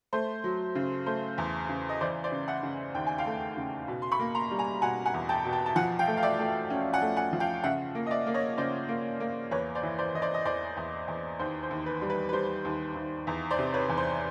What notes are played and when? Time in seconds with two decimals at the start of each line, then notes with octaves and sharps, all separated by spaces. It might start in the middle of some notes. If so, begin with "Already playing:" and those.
0.13 A3 C5
0.44 F#3
0.75 C#3
1.06 A3 C5
1.38 E2
1.69 C#3
1.89 D#5
2.01 E3 C5 D5
2.24 C5 D5
2.32 C#3
2.47 E5 F#5
2.63 C#3
2.94 D#2 G5
3.07 G#5
3.18 F5 G5
3.26 A3
3.57 C#3
3.88 B2
4.02 C6
4.12 B5 C#6
4.19 A#3
4.35 A#5 C6
4.51 G3
4.59 G#5 A#5
4.82 B2 F#5 G#5
5.06 F#5 G#5
5.14 E2
5.29 G5 A5
5.45 B2
5.53 G5 A5
5.66 A5
5.76 F3 F#5 G#5
5.99 F5 G5
6.07 A3
6.17 F5
6.23 D5 E5
6.39 A3
6.70 C#4
6.93 F#5 G#5
7.02 A3
7.16 F#5 G#5
7.33 F3
7.40 F5 G5
7.64 C#3 E5 F#5
7.95 A#3
8.06 D#5
8.11 D5 E5
8.27 A#3
8.34 C#5 D#5
8.58 C#3 C5 D5
8.89 A#3
9.20 A#3
9.51 E2 B4 C#5
9.75 C5 D5
9.83 E3
9.98 C5 D5
10.14 E3 D#5
10.22 C5 D5
10.34 D#5
10.45 E2 C5 D5
10.77 E2
11.08 E2
11.39 D#2 C5
11.63 C5
11.70 D#2
11.86 B4
12.02 G3
12.10 B4
12.29 B4
12.33 G3 C5
12.65 D#2
12.95 D#2
13.27 E2
13.50 C5 D5
13.58 C3
13.74 B4 C#5
13.89 E2
13.98 C5